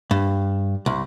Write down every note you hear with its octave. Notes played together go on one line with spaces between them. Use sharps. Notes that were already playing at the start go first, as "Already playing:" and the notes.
G2
C2